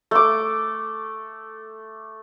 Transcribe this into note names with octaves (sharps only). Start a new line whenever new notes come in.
A3 D6